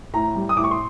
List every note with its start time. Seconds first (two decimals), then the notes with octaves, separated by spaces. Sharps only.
0.13 A2 A#5
0.35 G3
0.49 D#6
0.57 A2 D6
0.64 C#6
0.71 C6